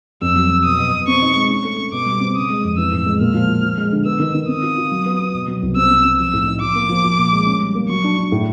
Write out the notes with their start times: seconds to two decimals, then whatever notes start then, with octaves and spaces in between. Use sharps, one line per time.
0.22 F2 E6
0.36 F#3
0.50 F#3
0.64 B2 D#6
0.78 B2
0.93 B2
1.07 C4 C#6
1.22 D#4
1.36 G#3
1.50 C#4 C#6
1.65 A3
1.79 C#4
1.92 B2 D6
2.06 G3
2.20 C4
2.35 C#3 D#6
2.50 G#3
2.64 F2
2.78 E3 E6
2.92 A2
3.06 G#3
3.21 A#2 F6
3.34 F3
3.49 F3
3.63 F3
3.78 G#3
3.92 D3
4.05 B3 E6
4.20 D#3
4.35 D#3
4.48 C4 D#6
4.63 F4
4.77 F4
4.92 F#3
5.06 B3
5.19 B3
5.34 B2
5.48 F#3
5.62 C2
5.76 C4 E6
5.90 C4
6.05 C4
6.19 F3 E6
6.33 A2
6.47 D#4
6.61 F3 D6
6.75 A#3
6.89 F3
7.04 F3
7.18 A#2
7.32 G#3
7.46 C#4
7.61 G3
7.75 A#3
7.89 F#3 C#6
8.04 D4
8.18 D4
8.32 A2